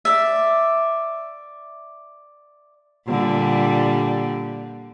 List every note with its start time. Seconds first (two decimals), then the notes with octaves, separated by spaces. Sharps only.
0.05 D5 E5
3.08 A#2 D3 G3